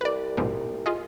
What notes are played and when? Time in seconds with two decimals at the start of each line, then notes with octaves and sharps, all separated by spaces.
0.01 C2 B4 D5
0.37 A#1 G#2 B2
0.86 F4 G#4 D#5